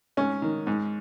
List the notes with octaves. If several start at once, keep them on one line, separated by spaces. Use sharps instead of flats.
G#2 C#4
D#3
G#2